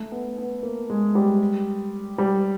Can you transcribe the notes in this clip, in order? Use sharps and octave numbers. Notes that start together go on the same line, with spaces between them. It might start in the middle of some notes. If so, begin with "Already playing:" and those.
Already playing: A3
B3
B3
A#3
G#3
G3
G3